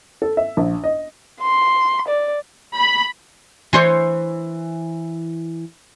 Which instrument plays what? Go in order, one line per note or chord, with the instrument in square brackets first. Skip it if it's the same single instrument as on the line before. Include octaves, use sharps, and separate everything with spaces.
[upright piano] A4
E5
A#1
D#5
[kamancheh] C6
D5
[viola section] B5
[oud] E3 C5 C#5